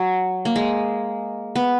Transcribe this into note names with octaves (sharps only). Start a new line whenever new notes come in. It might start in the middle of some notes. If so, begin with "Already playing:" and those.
Already playing: F#3
A#3
G#3
B3